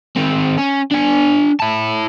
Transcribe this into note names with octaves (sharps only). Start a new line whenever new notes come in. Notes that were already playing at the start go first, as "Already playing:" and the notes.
D#3 C4
C#4
D4 G#5
E4 A5